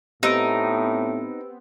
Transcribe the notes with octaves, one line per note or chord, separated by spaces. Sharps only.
A2 B3 C4 D#4 G4 E6 D7